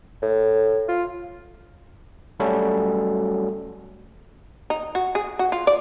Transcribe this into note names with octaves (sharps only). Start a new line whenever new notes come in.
A2
F4
F#3 G3 A3 C#4 F#4 A4
D#4
F#4
G#4
F#4
F4
D5